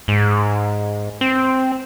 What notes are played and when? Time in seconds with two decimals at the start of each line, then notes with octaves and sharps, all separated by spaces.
0.08 G#2
1.21 C4